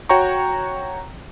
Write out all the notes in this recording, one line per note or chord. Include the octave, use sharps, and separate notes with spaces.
F#4 C#5 G5 A#5 C#6